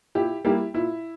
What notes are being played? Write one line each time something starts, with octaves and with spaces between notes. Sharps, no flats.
A#2 E4 G4
G3 A#3 E4 G4
A#2 E4